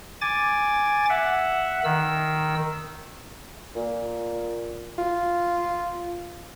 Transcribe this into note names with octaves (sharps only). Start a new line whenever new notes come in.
G#5 D6 A6
E5 F#5
D#3 E6
A#2
F4